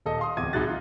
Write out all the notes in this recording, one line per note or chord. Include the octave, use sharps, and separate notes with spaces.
D#1 A4 D#5
F5 C6 D#6
D1 E2 C3 D6 G#6 D#7
C2 D#4 F#4 G#4 F#6 A6
D#4 F4